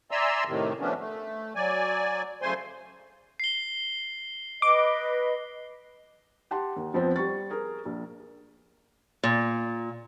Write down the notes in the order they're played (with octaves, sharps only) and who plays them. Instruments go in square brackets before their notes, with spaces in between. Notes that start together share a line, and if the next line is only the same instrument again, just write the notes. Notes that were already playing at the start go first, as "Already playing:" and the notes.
[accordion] D5 E5 G#5 A#5 C6 E6
A2 C3 D#3
F3 A3 B3 C#4 D4
A3
F#3 D5 G#5
F#2 C#3 A3 C5 G#5 C6
[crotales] C7 G7
[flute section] B4 D#5 [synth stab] D6
[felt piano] G4 F#5 A5 C6
D#2
F2 F3 B3 C4
G3 C#6 A6
G#4 A#4
A#1
[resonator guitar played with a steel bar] A#2